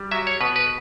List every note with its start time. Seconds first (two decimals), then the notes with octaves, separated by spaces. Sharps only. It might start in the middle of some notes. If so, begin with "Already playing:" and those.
Already playing: G3
0.11 F#3 E5
0.27 C#5
0.41 B2 B4
0.56 B4